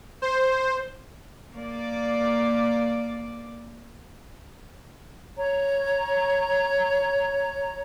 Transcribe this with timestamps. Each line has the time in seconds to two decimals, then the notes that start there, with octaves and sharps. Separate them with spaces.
0.22 C5
1.54 A#3 D5
5.38 C#5 A#5